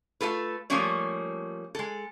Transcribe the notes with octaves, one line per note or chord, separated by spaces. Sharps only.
A3 F4 A4 B4
F3 G3 A3 A#3 C#4 C#5
G#3 A4